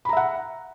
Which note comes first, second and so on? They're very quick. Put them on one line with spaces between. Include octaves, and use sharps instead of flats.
B5 A#5 E5 F#5